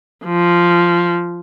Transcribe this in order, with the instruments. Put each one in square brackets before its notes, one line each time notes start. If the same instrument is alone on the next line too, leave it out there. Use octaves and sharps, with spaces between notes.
[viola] F3